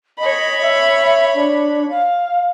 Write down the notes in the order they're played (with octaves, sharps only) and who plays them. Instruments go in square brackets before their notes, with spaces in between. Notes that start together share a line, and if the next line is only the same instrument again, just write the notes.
[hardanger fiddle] C#5 B5 [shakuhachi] D#5
[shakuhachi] E5
D4
F5